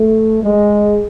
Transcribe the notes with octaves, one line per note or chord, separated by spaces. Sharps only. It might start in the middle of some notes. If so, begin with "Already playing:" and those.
Already playing: A3
G#3